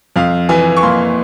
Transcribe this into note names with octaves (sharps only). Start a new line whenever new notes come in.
F2 F5
E3 G#5
C#6
A#3 C6